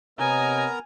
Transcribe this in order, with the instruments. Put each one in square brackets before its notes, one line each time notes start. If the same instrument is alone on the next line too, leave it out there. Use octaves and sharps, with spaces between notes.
[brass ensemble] C3 C#5 D#5 [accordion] B3 A#4 A#5 [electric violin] G#5